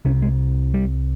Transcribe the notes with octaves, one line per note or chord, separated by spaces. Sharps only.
C2 C3 C#4
G#3
G3